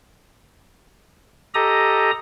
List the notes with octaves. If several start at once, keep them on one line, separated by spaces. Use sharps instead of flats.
G4 A4 D#5 A#5 D#6